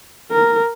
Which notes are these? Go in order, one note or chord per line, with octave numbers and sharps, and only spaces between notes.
A#4